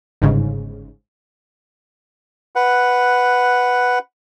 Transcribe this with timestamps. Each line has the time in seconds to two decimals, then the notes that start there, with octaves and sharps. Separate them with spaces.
0.22 G1 G#2 C#3
2.56 B4 F#5